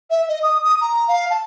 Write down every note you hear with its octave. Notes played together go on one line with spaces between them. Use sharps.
E5
D#5
D#6
D#6
A#5
F5
A5